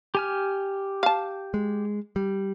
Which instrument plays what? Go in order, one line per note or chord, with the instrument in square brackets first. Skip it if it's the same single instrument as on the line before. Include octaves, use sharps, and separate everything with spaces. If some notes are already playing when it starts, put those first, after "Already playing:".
[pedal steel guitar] G4 G#5 F6
[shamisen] F5 A5
[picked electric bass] G#3
G3